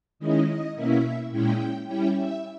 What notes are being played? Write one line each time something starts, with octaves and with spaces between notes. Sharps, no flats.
D#3 G#3 C#4 E4 D#5
D#5
B2 A#3 C#4 E4 E5
A#2 G#3 C#4 E4 G5
G3 C#4 E4 G5
E5